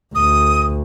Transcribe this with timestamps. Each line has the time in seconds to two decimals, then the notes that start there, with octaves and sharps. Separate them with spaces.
0.15 D2 D#6